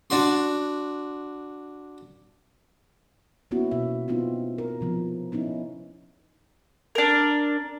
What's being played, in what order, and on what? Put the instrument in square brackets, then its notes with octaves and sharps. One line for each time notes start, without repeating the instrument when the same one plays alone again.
[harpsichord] D4 F#4 C6
[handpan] A#3 B3 C#4 E4 F#4
B2 E5
B3 C4 D#4 F4
A#4
C3 F3 B3
B3 C#4 D#4 E4
[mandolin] D4 A#4